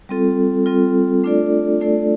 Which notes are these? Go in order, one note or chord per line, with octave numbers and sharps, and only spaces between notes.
G3 C4 F4 A4
G3 C4 F4 A4
A3 D4 F4 A4 D5
A3 D4 F4 A4 D5